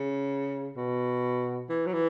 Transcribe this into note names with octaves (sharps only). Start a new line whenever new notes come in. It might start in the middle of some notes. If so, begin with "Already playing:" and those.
Already playing: C#3
B2
E3
F#3
E3